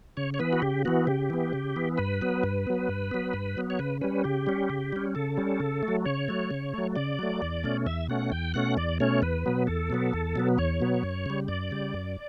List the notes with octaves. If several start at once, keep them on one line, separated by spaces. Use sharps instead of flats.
C#3 C#5
C#5
E3 B3 B4
F#4
C#3 G4
E3 B3 F#4
C#3 G4
E3 B3
C#3
E3 B3
G2 B4
F#3 B3
G2
F#3 B3
G2
F#3 B3
G2
F#3 B3
C#5
C#3 B4
G3 C#4 B4
C#3 G4
G3 C#4
C#3
G3 C#4
C#3 A4
G3 C#4
C#3
A3
F#3
C#3 C#5
F#3 A3
C#3
F#3 A3
C#3 D5
F#3 A3
E2
B2 A3 C#4
E2 E5
B2 A3 C#4 F#5
E2 G5
B2 A3 C#4 F#5
E2 D5
B2 A3 C#4 C#5
E2 B4
B2 F#3 B3
E2 A4
B2 F#3 B3
E2
B2 F#3 B3
E2 C#5
B2 F#3 B3
F#2
C#3 G3
F#2 D5
C#3 G3
F#2